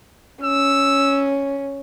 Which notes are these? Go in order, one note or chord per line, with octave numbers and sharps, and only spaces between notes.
C#4 E6